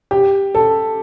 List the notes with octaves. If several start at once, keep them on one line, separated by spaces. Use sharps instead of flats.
G4
A4